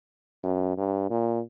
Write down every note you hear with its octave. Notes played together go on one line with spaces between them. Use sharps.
F#2
G2
A#2